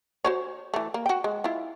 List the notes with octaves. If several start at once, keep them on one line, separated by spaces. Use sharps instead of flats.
F#4 C5 C#5
E3 A3
A#3
F#4 G5
G#3
E4 F4